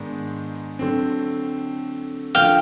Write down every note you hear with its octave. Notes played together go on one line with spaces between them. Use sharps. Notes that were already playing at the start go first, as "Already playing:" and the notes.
Already playing: G#2 D#3 G#3 B3 D4
D3 F#3 A3 C4
D3 F3 A3 F5 G5